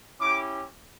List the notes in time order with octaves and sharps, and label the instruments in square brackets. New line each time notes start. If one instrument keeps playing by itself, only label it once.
[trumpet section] C#4 E4 G4 D6